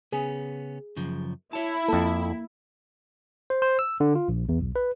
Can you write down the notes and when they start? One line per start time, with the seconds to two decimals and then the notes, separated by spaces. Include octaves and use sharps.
0.12 C#3 B3 C#4 G#4
0.97 F#2 C#3 F3
1.53 E4 C#5 A5
1.88 F2 A#3 A4
3.50 C5
3.62 C5
3.79 E6
4.00 D3
4.15 F4
4.28 A#1
4.49 E2
4.61 B1
4.76 B4